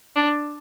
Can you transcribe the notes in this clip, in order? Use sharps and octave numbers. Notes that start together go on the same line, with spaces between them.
D4